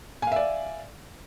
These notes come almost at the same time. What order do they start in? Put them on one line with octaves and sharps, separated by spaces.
G#5 F5 E5 D5